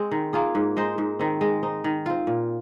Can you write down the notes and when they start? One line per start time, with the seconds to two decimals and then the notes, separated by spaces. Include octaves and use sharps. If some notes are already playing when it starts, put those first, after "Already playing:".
Already playing: G#3 C4
0.11 D#3
0.33 A#3 F4 G#4
0.55 G#2
0.77 G#3 D#4 C5
0.98 G#2
1.19 D#3 C4
1.41 G#3
1.63 D#4 C5
1.84 D#3
2.06 C4 F4
2.27 A#2